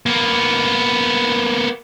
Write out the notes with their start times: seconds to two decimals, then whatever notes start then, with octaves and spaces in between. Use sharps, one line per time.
0.06 A#3 B3